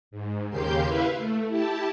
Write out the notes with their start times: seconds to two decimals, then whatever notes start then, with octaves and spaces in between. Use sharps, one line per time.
0.11 G#2
0.50 D#2 C#3 A#3 G4 C6 G6
0.85 E4 B4 E5 F5
1.17 A3
1.48 E4 G4 A5